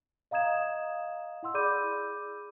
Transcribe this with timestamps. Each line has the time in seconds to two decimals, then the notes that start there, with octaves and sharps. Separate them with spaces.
0.31 D#5 F5 A#5 D#6 G#6 E7
1.43 E4 F#5 C6 E6
1.54 G#4 D5 B5 D6 G6 D#7